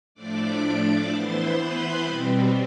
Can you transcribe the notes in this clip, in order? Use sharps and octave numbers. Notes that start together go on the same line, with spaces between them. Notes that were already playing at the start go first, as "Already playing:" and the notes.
A2 F3 A3 D4 D5 D6
E3 B3 E4 C5 C6
B4 B5
B2 G3 C4